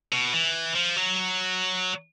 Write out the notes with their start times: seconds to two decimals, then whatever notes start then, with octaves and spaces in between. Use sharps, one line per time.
0.12 B2
0.33 E3
0.75 F3
0.96 F#3